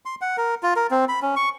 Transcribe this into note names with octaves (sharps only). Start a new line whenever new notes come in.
C6
F#5
A#4
F4
A#4
C4
B5
C#4
C#6